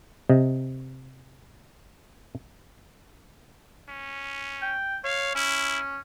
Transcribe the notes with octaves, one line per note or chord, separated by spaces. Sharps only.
C3 D#5
C#4
G5
C#5 F5
C#4 E4